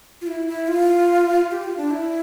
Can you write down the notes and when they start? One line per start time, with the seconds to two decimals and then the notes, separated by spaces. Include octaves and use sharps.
0.21 F4
0.27 E4
0.48 E4
0.68 F4
1.51 G4
1.63 F4
1.77 D4
1.91 E4